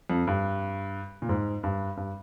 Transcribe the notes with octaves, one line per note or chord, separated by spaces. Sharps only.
F2
G2
A#2
G#2
G2
G2